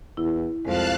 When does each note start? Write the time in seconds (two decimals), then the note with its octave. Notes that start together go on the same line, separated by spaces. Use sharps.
0.17 E2 E4
0.65 C2 F2 G#3 F5 A5 F#6